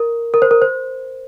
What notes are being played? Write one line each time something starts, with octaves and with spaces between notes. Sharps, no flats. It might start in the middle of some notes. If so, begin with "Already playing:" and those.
Already playing: A#4
A#4
C5
A#4
C5